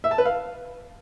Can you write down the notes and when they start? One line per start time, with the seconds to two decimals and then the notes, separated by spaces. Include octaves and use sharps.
0.04 E5
0.11 A5
0.18 B4
0.25 F5